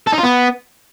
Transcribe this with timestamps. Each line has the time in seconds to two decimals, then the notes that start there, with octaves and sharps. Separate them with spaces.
0.07 A4
0.13 D#4
0.18 F4
0.24 B3